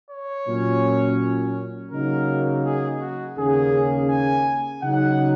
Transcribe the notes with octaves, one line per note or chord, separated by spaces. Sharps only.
C#5
A#2 F#3 C#4
C#3 F#3 A#3 D#4 A#4
G#4
F#4
D#2 C#3 A#3 C#4 G#4
G#5
C#3 F#3 D#4 F#5